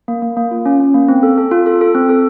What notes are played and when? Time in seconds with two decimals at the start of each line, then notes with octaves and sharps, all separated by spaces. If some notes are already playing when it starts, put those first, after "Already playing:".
0.08 A#3
0.22 A#3
0.37 A#3
0.51 F4
0.66 C#4
0.80 C#4
0.94 A#3
1.08 C4
1.23 A4
1.38 A4
1.51 F4
1.66 A4
1.81 A4
1.95 C4
2.09 A4